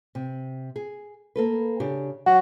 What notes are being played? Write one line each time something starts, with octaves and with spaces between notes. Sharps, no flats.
C3
G#4
A#3 A4 B4
C#3 D4 G4
F#3 F#4